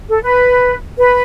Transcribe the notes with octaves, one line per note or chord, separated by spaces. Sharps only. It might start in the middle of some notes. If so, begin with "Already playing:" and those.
A4
B4
B4